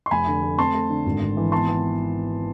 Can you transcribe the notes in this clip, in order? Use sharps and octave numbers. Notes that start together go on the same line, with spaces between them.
C6
F1 G#5 B5
D3
A3
C4 A5 C6
A3
D3
G#1
G#1
E3
B3 A5 C6
B3